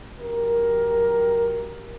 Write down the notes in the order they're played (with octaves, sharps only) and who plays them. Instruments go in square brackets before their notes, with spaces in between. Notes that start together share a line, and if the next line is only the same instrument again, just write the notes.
[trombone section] F#2 G4 A#4